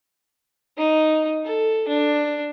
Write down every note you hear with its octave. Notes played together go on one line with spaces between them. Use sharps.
D#4
A4
D4